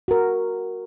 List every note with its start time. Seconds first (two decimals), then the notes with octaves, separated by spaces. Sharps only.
0.08 F#4 A#4